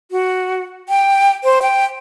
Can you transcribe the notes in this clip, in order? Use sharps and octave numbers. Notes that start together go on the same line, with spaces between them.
F#4
G5
C5
G5